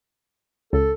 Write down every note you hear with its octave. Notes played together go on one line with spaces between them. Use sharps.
C#2 A4